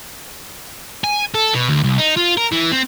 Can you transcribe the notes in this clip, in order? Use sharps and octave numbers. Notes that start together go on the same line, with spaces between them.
G#5
A4
B2
D2
C2
D#4
F4
A#4
E3
C4